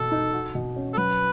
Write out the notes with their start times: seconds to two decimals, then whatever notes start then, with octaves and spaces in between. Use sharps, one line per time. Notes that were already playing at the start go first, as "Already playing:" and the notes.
Already playing: B2 F#4 A4
0.12 D#4
0.33 F#4
0.55 B2
0.76 C#4
0.94 A4
0.97 F#3 B4